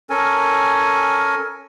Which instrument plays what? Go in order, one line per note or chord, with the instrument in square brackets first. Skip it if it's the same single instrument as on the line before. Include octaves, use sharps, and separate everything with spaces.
[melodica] C#4 A4 A#4 G#5